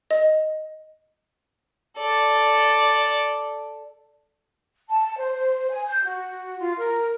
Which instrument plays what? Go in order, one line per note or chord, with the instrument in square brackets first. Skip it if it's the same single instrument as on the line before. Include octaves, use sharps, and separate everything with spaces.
[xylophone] D#5
[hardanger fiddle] A4 D5
[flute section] A5
C5
C5
G#5
G6
F#4
F4
A#4